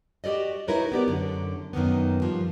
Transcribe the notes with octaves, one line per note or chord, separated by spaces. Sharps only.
F#4 G4 A4 D5 D#5
D#4 E4 F#4 A#4 B4 C#5
B3 G4 D5
F#2 D3
F#2 D#3 A#3 B3
G2 F3